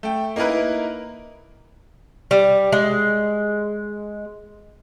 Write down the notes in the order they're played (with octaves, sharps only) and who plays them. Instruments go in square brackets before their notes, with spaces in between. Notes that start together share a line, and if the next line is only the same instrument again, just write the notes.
[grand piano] A3 G5
A#3 D#4 E4 A#4 B4
[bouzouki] G3
G#3